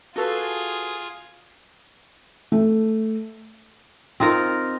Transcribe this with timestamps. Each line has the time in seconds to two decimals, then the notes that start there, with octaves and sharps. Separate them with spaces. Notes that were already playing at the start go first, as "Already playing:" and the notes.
0.16 F4 F#4 G#4 A4 B4
2.52 A3
4.20 C4 D#4 F4 A#4